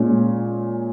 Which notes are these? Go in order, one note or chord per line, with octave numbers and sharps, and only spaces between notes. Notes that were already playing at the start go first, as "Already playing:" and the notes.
Already playing: A#2 G#3 C#4